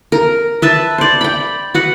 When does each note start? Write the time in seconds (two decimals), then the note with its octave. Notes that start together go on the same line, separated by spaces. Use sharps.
0.12 A#4
0.62 B4 E5 A5
0.98 C5 D5
1.21 G5 B5
1.74 F#4 B4 F#5